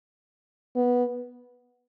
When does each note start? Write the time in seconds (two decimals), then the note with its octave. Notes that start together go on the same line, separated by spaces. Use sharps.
0.76 B3